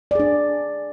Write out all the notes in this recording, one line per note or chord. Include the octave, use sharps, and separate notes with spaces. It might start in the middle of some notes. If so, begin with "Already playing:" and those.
D4 G#4 D5